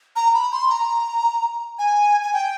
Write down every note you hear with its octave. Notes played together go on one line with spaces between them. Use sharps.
A#5
B5
C6
A#5
G#5
G#5
G5